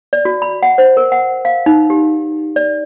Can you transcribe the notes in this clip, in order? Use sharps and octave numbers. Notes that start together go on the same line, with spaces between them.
D5
F#4
B5
F#5
C5
A#4
F#5
F5
D#4
G4
D5